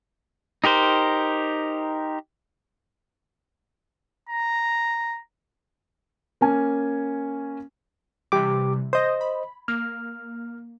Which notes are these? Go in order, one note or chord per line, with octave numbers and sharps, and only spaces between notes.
D#4 G4 A#4 C5
A#5
A#3 C#4 G#5
C3 E3 G3 G4 D6
C5 D#5 D#6 G6 A#6
B5
A#3 F6